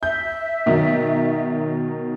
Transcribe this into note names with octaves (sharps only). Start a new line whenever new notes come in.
E5 G6
B2 D#3 F#3